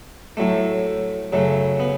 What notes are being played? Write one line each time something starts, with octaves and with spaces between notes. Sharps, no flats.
A2 F#3 A3
F#2 C#3 F#3 A3
B3